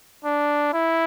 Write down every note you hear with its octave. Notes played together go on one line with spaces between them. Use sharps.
D4
E4